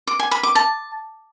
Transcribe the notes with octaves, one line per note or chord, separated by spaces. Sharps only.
D6
G#5
B5
D6
A5